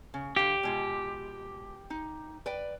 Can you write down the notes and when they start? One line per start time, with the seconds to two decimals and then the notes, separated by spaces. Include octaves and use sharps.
0.14 C#3
0.36 D3 G4 F5
0.63 B2 G#3 F4
1.90 D#4
2.46 B4 D5 G5